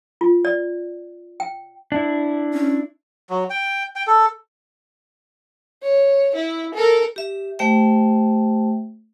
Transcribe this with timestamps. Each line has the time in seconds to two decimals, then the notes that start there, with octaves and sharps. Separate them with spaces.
0.21 F4
0.45 D5
1.40 G5
1.92 D4 E4
2.54 C#4
3.30 F#3
3.50 G5
3.96 G5
4.07 A4
5.82 C#5
6.35 E4
6.74 A4 A#4
7.16 G4 E5
7.59 A3 G4 C5 E5 G5